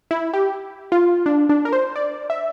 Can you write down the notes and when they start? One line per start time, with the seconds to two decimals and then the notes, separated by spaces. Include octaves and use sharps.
0.11 E4
0.34 G4
0.92 F4
1.26 D4
1.49 D4
1.65 A#4
1.73 C5
1.96 D5
2.30 E5